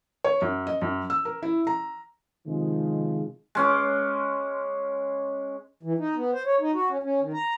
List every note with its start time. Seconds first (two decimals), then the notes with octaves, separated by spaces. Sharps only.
0.24 C#5
0.42 F#2
0.67 D#5
0.82 F#2
1.10 E6
1.25 A#4
1.42 E4
1.67 A#5
2.47 C3 D#3 F3 G#3
3.55 G#3 C#4 D6
5.83 E3
5.98 D#4
6.15 B3
6.33 C5
6.46 C#5
6.60 D#4
6.74 F#4
6.89 C#4
7.03 C#4
7.21 D#3
7.33 A#5